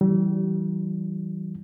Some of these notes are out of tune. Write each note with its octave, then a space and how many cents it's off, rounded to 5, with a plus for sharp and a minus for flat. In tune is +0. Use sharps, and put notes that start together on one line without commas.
E3 -10 G3 -40